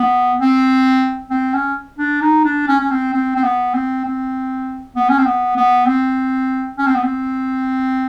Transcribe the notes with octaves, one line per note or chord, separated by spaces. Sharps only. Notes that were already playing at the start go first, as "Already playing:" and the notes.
Already playing: B3
C4
C4
C#4
D4
D#4
D4
C#4
C#4
C4
C4
C4
B3
C4
C4
B3
C#4
C4
B3
B3
C4
C#4
C4
B3
C4